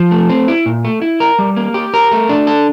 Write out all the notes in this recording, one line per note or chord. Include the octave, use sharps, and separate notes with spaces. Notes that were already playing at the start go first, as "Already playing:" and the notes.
Already playing: F3
A3
C4
E4
A#2
A3
E4
A#4
G3
A#3
G4
A#4
A3
D4
A4